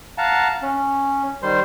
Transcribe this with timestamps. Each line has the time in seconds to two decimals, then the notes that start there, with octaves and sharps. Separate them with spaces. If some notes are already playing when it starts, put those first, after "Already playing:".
0.18 F5 F#5 A5 A#5
0.62 C#4
1.43 D#3 G3 C5 C6